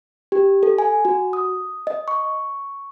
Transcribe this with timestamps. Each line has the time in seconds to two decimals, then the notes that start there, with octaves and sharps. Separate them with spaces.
0.32 G4
0.63 A4
0.78 G#5
1.05 F#4
1.33 D#6
1.87 D#5
2.08 C#6